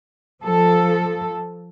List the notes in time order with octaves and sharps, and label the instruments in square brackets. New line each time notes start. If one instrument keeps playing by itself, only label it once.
[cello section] F3 A4